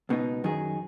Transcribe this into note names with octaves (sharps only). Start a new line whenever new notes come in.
C#2 B2 B3 D#4
F#2 D#3 F#3 D#4 G#4